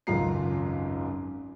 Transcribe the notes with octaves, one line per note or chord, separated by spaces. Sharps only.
G#1 C#2 F#2 F4 A#5 C7